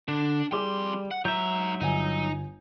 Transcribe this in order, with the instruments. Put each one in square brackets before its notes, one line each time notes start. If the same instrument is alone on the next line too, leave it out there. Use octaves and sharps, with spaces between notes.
[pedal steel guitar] D3 [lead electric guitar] D4
[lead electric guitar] F2 C6 [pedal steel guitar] G3 [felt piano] G#4 D6
[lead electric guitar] F#5
[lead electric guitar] G#2 A#5 [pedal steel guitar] F#3 E5 [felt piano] G6
[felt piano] G1 G#5 [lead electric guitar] D#4